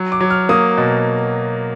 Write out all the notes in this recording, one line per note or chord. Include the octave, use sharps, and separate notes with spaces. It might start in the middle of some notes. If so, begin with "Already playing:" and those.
Already playing: F#3
D6
F#3
F6
A#3 D#6
B2